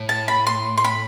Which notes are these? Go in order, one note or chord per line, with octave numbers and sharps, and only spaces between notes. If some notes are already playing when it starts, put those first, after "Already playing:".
Already playing: A2
A5
B5
C6
C6
B5